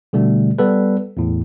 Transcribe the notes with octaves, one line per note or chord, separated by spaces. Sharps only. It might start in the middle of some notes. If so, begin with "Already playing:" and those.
B2 D3 G3 A3
G3 B3 A4 B4
E2 A2